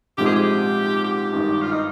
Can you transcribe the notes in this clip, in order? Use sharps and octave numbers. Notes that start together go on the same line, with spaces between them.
A#1 G#2 F3 G#3 C4 G4
G#4
G4
G4
G#1 G2 D#3
F4
D#4